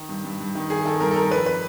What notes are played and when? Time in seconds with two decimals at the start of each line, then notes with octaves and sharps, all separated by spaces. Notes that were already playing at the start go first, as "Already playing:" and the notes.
Already playing: D#3
0.09 G2
0.24 G2
0.40 G2
0.55 D#3
0.70 D#3 G#4
0.85 D#3 A4
1.00 G2 A#4
1.11 A4
1.16 G2 A#4
1.31 F2 B4
1.46 B4